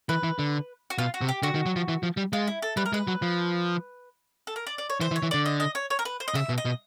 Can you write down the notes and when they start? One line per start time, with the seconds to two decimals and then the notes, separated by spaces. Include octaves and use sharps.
0.09 E3 B4
0.23 E3
0.39 D3
0.90 F#4
0.98 B2 F4
1.14 F#4
1.21 C3
1.29 G4
1.42 D3 F#4
1.55 D#3
1.66 F#3
1.76 F3
1.88 E3
2.03 F3
2.17 G3
2.33 G#3 F4
2.47 E4
2.62 A4
2.77 G3 B4
2.86 A#4
2.93 G#3 B4
3.07 F#3
3.22 F3
4.47 A4
4.56 A#4
4.67 D5
4.78 D5
4.90 C#5
5.00 E3 C5
5.11 E3
5.16 C#5
5.22 E3
5.31 D3 D5
5.46 D#5
5.60 D#5
5.75 C#5
5.90 C#5
5.99 A#4
6.05 B4
6.20 C5
6.28 D#5
6.34 C#3 E5
6.49 B2
6.58 D#5
6.65 B2